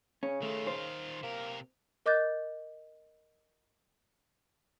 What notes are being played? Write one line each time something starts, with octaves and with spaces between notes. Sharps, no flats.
C#3 C#4
D#3 A3 F4
C5
C3 A#3 A#4
A#4 D#5 D6 F#6 G6 A6